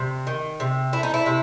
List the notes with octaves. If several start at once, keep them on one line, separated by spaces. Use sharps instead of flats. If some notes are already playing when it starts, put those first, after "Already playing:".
Already playing: C3
D#3
C3
A3 E4
D#4
E4
C3